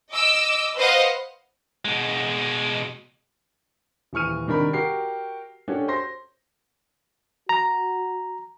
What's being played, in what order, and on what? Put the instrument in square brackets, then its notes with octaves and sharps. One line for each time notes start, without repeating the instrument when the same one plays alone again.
[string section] D#5 D6 E6
B4 C5 D#5 F5 F#5
[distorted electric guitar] B2 G#3
[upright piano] D#1 E3 C#6 F6 D#7
C3 D#3 D4 A#4 B5
F#4 G4 A#4 C7
C#4 D4 F#4 G4 A4 C#5
C5 C6 A#6
[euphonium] F#4 [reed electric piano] A#5